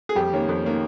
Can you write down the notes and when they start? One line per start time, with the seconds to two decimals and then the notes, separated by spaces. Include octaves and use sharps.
0.09 G#4
0.15 F2 G3 G4
0.33 D#3 A#3 C#4
0.48 F2
0.65 D#3 A#3 C#4